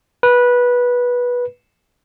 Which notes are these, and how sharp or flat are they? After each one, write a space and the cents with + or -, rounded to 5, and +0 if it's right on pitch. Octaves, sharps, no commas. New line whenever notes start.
B4 -15